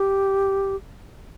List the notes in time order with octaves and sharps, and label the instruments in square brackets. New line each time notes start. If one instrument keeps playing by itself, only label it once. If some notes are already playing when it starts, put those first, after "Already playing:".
Already playing: [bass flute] G4